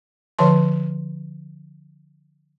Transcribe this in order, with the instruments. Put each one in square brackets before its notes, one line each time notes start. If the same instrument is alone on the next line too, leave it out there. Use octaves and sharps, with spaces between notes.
[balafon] D3 F3 B4 C#5 A5 C6